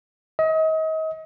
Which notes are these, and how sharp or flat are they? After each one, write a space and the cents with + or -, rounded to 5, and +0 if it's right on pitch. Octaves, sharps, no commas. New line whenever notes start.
D#5 +35